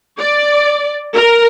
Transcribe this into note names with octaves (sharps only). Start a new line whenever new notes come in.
D5
A#4